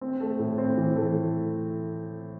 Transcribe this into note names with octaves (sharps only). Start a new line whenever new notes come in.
C4
A3
A2
C4
E3
A3